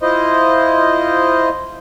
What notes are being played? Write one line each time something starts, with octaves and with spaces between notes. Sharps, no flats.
E4 F4 C5 D#5